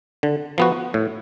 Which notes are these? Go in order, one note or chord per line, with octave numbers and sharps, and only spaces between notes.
D3
F3 B3 F#4
A2